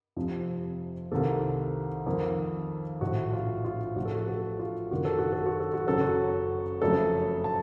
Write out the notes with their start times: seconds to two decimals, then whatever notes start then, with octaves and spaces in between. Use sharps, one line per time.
0.16 F1 F2 C3 F3
1.11 C2 C3 D#3 A#3 A4
2.06 F2 D#3 A#3
3.01 A#1 A2 F3 A3 F#4
3.33 F4
3.65 F4
3.96 A1 A2 F3 A3 F#4
4.05 A4
4.15 F#4
4.28 A4
4.59 F4
4.91 F#1 F#2 D#3 A#3 F#4
5.05 A4
5.19 F#4
5.33 A4
5.46 F#4
5.60 A4
5.74 F#4
5.86 F#1 F#2 C#3 F#3 A4
6.01 F#4
6.81 F#1 F2 C#3 F#3 A3 A4
7.44 A5